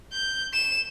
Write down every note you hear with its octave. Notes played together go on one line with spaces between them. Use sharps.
G6
E7